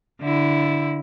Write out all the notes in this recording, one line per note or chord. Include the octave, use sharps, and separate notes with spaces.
D3 E4